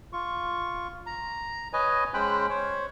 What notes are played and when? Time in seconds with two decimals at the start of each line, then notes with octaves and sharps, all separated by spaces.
0.13 F4 C#6
1.06 A#5
1.73 B4 C#5 D#5 G#5
2.14 G#3 C#4 C5 G5 B5 F#6
2.50 C5 C#5